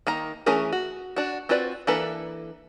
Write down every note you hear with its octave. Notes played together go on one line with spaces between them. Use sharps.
D#3 A#3 A#5
E3 A3 C#4 G#4 A#4
F#4
D4 F#4
C4 F4 F#4 B4 D5
E3 A#3 D4 A4 B4